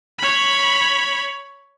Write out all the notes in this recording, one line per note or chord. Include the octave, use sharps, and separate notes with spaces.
C#5 B5